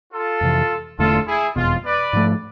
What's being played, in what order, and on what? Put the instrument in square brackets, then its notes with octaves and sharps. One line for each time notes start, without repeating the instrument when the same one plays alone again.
[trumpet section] F4 A4
[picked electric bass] F2 C3 E3
[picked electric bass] E1 E2 D3 A3 [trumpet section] F4 A4
[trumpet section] E4 G#4
[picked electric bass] F1 E2 B2 [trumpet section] F4
[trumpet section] B4 D5
[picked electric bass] G#2 F3 A3